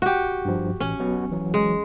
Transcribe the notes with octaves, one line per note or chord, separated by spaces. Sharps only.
F#4 G4
G2 F3
A1 C#4
F#3 B3 F#4
E3 F#3
G#3